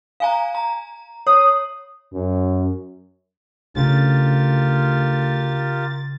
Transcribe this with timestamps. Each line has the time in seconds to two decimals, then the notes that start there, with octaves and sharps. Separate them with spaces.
0.20 F5 G#5 A#5
0.55 A#5
1.27 C#5 D#6
2.13 F#2
3.75 D2 C#3 F4 G4 A#4 A6